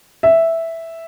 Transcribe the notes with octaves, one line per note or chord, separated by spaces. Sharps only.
E5